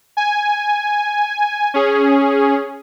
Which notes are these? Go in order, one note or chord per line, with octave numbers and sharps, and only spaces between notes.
G#5
C#4 G#4